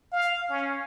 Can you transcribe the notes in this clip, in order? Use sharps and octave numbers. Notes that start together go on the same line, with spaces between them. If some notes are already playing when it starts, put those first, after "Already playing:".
F5
C#4